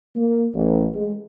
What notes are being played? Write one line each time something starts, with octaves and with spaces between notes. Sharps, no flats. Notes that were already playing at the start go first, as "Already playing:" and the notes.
A#3
A1
G#3